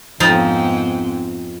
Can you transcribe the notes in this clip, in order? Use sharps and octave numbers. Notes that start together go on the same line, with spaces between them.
F2 G#2 F3 B3 C4 D#4